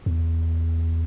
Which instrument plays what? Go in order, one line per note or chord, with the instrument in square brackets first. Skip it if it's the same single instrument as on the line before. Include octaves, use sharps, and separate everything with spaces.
[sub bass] E2